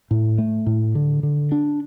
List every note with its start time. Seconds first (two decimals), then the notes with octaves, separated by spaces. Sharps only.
0.11 A2
0.38 A3
0.66 A2
0.95 D3
1.23 D3
1.52 D4